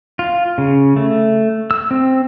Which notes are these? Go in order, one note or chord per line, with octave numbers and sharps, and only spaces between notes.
F4
C#3
A3
E6
C4